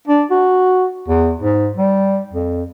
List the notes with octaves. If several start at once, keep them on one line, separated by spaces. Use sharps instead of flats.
D4
F#4
E2
G#2
G3
F2